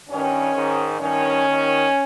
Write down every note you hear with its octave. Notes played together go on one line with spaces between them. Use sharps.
G2 D#3 C#4
G#2 D#3
G2 D#3 C#4
D#2 D#3